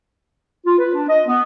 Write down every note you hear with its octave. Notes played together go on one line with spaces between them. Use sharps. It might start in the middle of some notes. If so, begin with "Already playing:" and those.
F4
B4
D4
D#5
B3